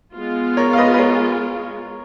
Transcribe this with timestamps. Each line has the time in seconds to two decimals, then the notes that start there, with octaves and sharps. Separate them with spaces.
0.15 G#3 B3 F4
0.57 A#4 C#5
0.73 F5
0.77 B4 D#5
0.94 B4
0.98 A#4 C#5